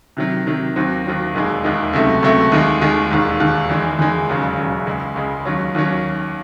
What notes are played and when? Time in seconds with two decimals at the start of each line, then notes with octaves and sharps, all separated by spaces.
0.17 C3 D#3 F#3
0.46 C3 D#3 F#3
0.76 D#2 D#3 F#3 C4
1.05 D#2 D#3 F#3 C4
1.34 E1 D#2 D#3 G#3
1.64 E1 D#2 D#3 G#3
1.93 C#2 C3 F#3 A3
2.23 C#2 C3 F#3 A3
2.52 D#2 D#3 G#3
2.81 D#2 D#3 G#3
3.11 E1 D#2 D#3
3.40 E1 D#2 D#3
3.69 E2 D#3 G#3
3.99 E2 D#3 G#3
4.28 E1 D#2 C#3 F#3
4.57 E1 D#2 C#3 F#3
4.87 C#2 C#3 G#3
5.16 C#2 C#3 G#3
5.45 D#2 D#3 F#3 C#4
5.74 D#2 D#3 F#3 C#4